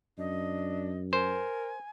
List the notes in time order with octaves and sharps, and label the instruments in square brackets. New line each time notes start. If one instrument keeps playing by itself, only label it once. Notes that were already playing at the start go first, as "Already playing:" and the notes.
[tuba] F#2 [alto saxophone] D4 [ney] D#5
[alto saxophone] A#4 [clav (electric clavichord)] C5 [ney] G#5